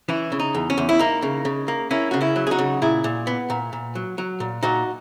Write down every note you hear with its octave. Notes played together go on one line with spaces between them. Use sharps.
E3 C#4 E4
C#3
D#4
E2
C#4
E2
E4
A#3 D#4
C#3
C#3
A#3
A#3 C#4 E4
C#3 F#4
C#4 E4
F#3
G#4
D#4 F#4
C#3
A#2 E4 G#4
A#2
B3
A#2
A#2
F#3
F#3
A#2
A#2 D#4 F#4